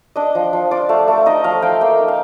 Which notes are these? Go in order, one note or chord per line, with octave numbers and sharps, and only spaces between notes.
D4 D#5
F3
F3
F4 D5
A3
A3
D#4 D#5
F3 F5
F3 G5
A#3 G5
D#4
F5